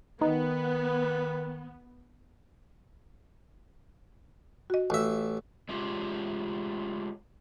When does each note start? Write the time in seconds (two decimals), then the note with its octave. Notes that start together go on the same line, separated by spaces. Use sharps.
0.21 D#3 B3 D#4 B4
4.70 F#4 D#5
4.90 A1 E5
5.69 G#3 A3 C#4 F4 G4